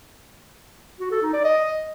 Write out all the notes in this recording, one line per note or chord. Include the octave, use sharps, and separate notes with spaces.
F#4
A4
D#4
D5
D#5